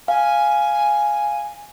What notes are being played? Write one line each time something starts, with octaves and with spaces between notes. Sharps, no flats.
F5 G#5